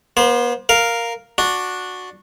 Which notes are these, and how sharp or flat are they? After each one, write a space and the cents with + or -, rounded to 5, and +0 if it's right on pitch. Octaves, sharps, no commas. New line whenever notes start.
B3 -45 C5 +0
A#4 +0 F5 +0
D4 +0 F#4 -10